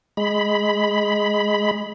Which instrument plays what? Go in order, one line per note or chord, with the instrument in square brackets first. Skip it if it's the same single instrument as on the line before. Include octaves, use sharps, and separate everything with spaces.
[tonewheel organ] G#3 B5